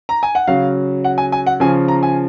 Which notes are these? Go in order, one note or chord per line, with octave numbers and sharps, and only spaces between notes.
A#5
G#5
F#5
C#3 F#3 F5
F#5
G#5
G#5
F#5
C#3 F3 G#5
A#5
G#5